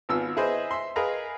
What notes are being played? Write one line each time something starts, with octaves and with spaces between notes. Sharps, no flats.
G#1 B3 F4 E6
E4 G#4 B4 C5 D#5
E5 C6
G#4 A#4 B4 D#5 F5 A#5